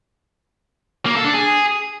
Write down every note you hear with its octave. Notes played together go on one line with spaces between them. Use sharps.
A#3
A4
D4
G#4